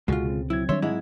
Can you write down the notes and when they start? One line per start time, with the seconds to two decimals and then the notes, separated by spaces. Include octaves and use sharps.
0.08 C#2 B2 D3 G#3 F4 F#4
0.26 C#3 C4
0.50 F#3 C4 E4 G#6
0.69 D#3 G3 D4 C#5 E5 C6
0.82 G#2 G#3 E4